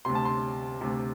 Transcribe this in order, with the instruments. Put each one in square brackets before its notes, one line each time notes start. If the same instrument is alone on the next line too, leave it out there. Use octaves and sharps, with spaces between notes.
[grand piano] D2 C3 C6
A5
C6
D2 C3